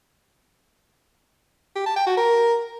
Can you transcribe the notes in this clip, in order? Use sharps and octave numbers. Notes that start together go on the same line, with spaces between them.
G4
A5
G5
F#4
A#4